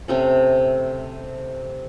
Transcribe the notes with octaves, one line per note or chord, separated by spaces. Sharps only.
C3 A3 C#4